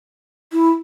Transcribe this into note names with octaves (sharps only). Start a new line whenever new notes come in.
E4